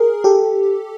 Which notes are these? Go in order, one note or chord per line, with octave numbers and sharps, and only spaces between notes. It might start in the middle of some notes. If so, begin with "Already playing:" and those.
Already playing: G#4 A#4
G4 A4